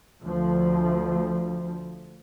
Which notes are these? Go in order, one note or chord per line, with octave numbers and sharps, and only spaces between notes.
D2 F3